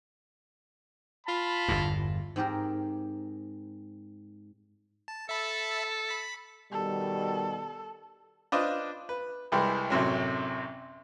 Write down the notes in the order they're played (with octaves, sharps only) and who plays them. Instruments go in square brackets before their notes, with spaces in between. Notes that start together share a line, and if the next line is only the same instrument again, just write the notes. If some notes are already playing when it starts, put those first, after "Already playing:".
[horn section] F4 A5 B5
[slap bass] G1 E2 G2
[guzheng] G#2 C4 G4 A#4
[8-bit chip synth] A5
[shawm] A4 [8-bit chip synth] E5 A5 B5
[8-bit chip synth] B5 B6
[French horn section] B2 D#3 G3 [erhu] A4
[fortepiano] D4 F4 B4 C5 D#5
B4
C2 E3 G3 G#3
A1 F#2 C3 F#3